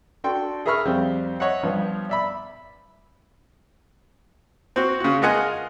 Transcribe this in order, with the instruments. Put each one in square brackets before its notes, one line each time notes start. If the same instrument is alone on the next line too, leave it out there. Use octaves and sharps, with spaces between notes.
[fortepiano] D4 F#4 A4 G5 C6 C#6
G#4 A#4 E5 B5 C#6 F6
F2 G3 C4 F5
C#5 D#5 E5 F#5
G2 F3 B3
D5 E5 B5
C4 F#4
C#3 F#4
G#3 F4 A#4 D#5 F#5 G#5